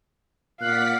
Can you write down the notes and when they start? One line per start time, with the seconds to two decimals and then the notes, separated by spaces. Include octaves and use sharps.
0.61 A#2 D5 F5 F#5 F#6 B6